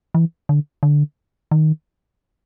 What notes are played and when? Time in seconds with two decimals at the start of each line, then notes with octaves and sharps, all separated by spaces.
0.15 E3
0.49 D3
0.83 D3
1.51 D#3